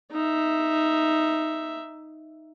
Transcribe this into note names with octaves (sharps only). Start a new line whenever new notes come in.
D#4 E5